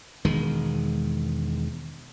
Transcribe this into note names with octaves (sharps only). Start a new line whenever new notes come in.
E1 D#3 G#3